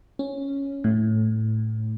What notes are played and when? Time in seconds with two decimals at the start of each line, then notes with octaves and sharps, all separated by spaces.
0.19 C#4
0.84 A2